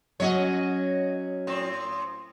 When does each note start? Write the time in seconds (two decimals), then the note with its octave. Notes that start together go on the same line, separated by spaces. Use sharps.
0.20 F#3 C#4 F#4 C#5 D#5
1.47 A2 C4